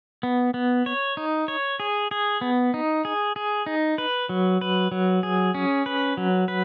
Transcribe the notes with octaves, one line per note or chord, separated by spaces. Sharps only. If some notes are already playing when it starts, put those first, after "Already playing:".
B3
B3
C#5
D#4
C#5
G#4
G#4
B3
D#4
G#4
G#4
D#4
B4
F#3
B4
F#3
G#4
C#4
B4
F#3
B4